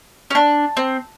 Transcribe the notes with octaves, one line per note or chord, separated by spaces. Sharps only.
C#4
D4
C4